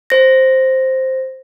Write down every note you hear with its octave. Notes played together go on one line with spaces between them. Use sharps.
C5 A#6